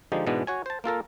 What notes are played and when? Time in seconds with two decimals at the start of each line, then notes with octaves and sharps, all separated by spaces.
0.12 D3 F3 G#3 D#4 G4
0.26 G#2 B2 E3 G#3 B3 D4
0.47 F#4 C#5 G#5
0.66 C5 A5
0.84 A#3 F4 A4 A#4